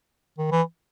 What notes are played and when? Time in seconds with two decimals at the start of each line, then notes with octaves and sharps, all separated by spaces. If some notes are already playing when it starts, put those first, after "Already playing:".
0.38 D#3
0.52 E3